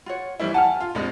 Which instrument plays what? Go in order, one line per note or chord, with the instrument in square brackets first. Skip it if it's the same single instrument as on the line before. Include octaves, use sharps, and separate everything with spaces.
[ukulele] F4 F#4 C#5
[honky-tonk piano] E3 G3 E4 [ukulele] C#4 C5 D5
[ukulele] F#5 G#5 [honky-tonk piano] A5 F6
[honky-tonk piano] F4
[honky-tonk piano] A#1 F2 G#3 [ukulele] D#4 G4 D5